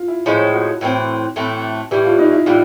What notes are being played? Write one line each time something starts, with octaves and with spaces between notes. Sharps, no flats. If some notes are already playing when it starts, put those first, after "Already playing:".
Already playing: F4
E4
A2 F3 G#3 C#4 E4
F#4
A2 E3 A3 C4
A2 E3 A3 C4
A2 E3 G3 G4
F4
D#4
E4
A2 E3 G3 F4